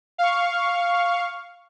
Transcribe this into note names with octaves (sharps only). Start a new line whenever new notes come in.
F5 C#6